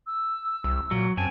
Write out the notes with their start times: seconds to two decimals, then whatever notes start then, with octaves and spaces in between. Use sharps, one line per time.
0.07 E6
0.64 C2
0.91 A#2 F#3
1.17 F#2 C4 G#5 A5